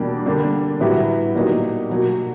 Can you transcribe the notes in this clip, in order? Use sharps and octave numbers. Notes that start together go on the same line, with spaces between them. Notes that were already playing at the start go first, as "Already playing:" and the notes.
Already playing: E2 B2 G3 A#3 D4
D3 G3 A#3 D4
A2 F#3 B3 E4 G4
A#2 F#3 A#3 D#4 G4
B2 F#3 A#3